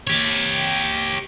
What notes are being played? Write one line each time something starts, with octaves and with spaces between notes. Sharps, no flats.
G4 C#5